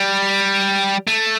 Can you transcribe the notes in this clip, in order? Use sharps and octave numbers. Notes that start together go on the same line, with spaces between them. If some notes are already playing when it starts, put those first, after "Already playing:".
Already playing: G3
A3